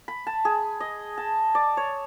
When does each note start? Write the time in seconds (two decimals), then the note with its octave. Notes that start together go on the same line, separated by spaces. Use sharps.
0.08 B5
0.27 A5
0.45 G#4
0.80 D#5
1.18 A5
1.55 D5
1.77 C#5